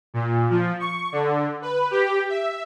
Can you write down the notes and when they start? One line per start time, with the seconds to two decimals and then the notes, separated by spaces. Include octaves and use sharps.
0.14 A#2
0.50 F3
0.80 C#6
1.12 D3
1.62 B4
1.91 G4
2.29 E5